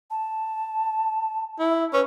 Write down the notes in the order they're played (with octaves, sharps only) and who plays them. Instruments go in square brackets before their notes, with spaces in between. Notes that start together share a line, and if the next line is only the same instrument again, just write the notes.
[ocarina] A5
[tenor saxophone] E4
[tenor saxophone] C#4 [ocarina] B4